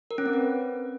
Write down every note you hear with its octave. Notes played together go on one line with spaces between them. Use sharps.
A#4
C#4
C4
B4